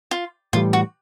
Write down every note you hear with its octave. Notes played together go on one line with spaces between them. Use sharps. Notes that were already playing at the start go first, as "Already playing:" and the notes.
F4
A2 E3 G3 F4
F#4